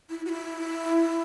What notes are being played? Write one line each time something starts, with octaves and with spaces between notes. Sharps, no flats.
E4
F#4
E4